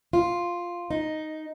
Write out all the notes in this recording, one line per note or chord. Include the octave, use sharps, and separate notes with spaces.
F4
D#4